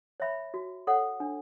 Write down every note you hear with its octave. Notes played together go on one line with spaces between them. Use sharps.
C#5 E5 B5
F#4
A4 C#5 F#5
D4